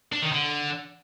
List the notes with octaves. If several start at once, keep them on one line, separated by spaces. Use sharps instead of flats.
D4
D#3
D3